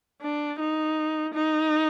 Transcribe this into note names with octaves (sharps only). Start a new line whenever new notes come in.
D4
D#4
D#4